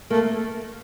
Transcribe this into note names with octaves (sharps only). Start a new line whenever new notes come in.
A3 A#3